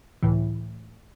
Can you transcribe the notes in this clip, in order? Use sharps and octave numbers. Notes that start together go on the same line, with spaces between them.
C#2 A2 E3